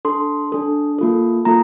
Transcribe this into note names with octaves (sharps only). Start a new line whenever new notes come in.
D4 A4 C6
D4 A4
A#3 F4 A4
A#3 F4 A4 A#5